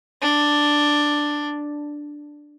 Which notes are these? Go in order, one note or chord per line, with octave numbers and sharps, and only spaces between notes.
D4